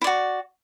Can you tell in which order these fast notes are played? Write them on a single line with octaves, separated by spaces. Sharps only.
E4 D5 F#4